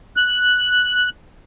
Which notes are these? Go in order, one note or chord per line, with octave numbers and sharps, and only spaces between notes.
F#6